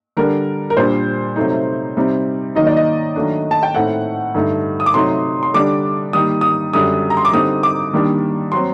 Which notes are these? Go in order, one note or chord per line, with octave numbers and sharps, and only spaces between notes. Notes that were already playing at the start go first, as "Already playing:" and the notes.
D3 G3 D4 A#4
A#4
A#2 G3 D4 C5
C3 F#3 A3 D#4
C3 G3 C4 D#4
D#3 F#3 A#3 D#4 D#5
D5
D#5
D#3 F#3 A3 D4
A5
G5
A2 A3 C4 D#4 F#5
G2 D3 A3 D#4
D#6
D6
C3 F#3 A3 D#4 C6
C6
D3 G3 D4 D6
D#3 G3 A#3 D#4 D#6
D#6
F#2 D3 G3 D#6
A#5
C6
D6
D3 G3 C4 D#4 D#6
D6
D#3 G3 A#3 D4
F#3 C4 C6